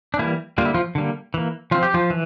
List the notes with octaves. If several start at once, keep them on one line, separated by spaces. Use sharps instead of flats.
D4
E3 G3 A#3 E4
D3 G3 A#3 F4
E4
F3 F4
D3 G3 A#3
E3 A#3
F3 C4 F4
G4
F3 F4
E3